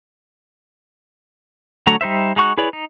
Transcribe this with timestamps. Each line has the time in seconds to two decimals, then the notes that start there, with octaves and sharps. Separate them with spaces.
1.87 D3 F#3 A3 C#5 A#5
2.01 G3 D#4 C5 E5
2.36 G#3 D#4 F#4 C#6 F#6
2.58 E4 G#4 B4 C#5 D5
2.73 D#4